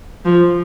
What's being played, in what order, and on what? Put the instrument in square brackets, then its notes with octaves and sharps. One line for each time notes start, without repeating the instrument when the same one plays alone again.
[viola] F3